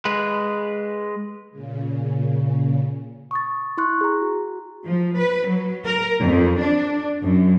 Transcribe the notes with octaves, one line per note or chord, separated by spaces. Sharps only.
G#3 B4
A#2 C#3
C#6 D#6 A6
E4 C6 C#6 F#6
G#4 A#5
F#4
F3
B4
F#3
A#4
F2
D4
F#2